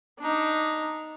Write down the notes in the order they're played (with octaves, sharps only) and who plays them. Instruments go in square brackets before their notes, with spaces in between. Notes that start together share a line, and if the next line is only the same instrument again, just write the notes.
[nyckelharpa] D4 D#4